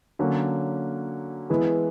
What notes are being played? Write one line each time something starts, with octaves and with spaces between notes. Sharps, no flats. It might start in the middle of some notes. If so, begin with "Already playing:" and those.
D3 F#3 A#3 C#4
E3 G#3 B3 E4